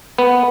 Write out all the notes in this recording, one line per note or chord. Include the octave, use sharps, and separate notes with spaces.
B3